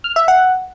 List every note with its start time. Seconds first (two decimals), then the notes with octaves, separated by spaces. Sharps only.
0.04 F6
0.16 E5
0.28 F#5